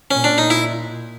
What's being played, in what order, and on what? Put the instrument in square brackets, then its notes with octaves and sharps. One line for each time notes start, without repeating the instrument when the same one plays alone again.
[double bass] A#2 [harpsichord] C#4
[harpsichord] D4
D#4
E4